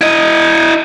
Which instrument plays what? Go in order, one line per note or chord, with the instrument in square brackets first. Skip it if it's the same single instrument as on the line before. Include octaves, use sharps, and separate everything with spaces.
[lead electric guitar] E4 D#5